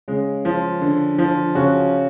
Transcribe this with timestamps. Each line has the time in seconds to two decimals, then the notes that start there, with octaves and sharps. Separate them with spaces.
0.08 C#3 G#3
0.45 F3
0.81 D3
1.18 F3
1.55 C#3 F#4